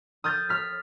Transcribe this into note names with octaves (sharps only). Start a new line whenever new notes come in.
D#6 F6 G6 A6
F6 B6